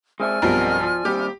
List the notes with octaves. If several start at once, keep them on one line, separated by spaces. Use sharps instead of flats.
G#3 C4 D5 E5 G#5 F6
B1 G2 F3 C4 A#4
F3
D#2 G3 C4 G4